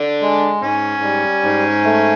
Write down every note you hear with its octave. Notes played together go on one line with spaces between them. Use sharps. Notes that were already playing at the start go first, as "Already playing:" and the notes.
Already playing: D3 D4
G#3
G#2 C#4
G3
G#2
A3